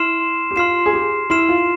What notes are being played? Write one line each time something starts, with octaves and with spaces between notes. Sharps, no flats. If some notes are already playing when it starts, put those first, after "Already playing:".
Already playing: E4 C6 F6 C7 E7
G4
F4 C6 F6 C7 E7
G#4
G4
E4 C6 F6 C7 E7
F4